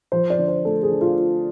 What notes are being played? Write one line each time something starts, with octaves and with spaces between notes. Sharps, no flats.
F3 C5
D5
D3
C5
A3 A4
G#4
D3
F4